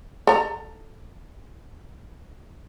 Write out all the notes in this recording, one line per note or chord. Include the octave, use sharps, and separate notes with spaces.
A4 A#5